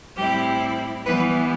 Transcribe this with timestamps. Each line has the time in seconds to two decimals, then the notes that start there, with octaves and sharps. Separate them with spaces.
0.17 A2 G3 C4 E4 G4
1.05 E3 G3 B3 B4